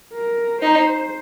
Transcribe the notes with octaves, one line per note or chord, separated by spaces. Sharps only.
A#4
D#4 C5